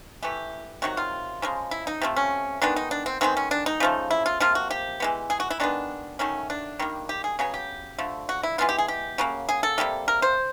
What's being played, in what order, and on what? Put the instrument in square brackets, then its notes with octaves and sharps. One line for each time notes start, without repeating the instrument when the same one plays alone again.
[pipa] E3 A3 G4
C3 D#3 F#3 F#4
F4
C#3 F3 G#3
E4
D#4
C3 F3 A3
C#4
D#3 G#3 B3 D4
D#4
D4
C4
D#3 G#3 B3 C4
C#4
D4
D#4
C#3 F3 A3
E4
F4
C3 F3 A#3 F4
F#4
G4
E3 G#3 B3
G#4
F#4
E4
D#3 G#3 B3 D4
D#3 F#3 A3 C#4
D4
D#3 G3 A#3
G4
G#4
C#3 F#3 B3 G#4
G4
D3 F3 A3
F#4
E4
E3 G#3 B3 F4
G4
G#4
G4
C#3 F#3 A#3
G#4
A4
C3 D#3 G3 A#3
A#4
C5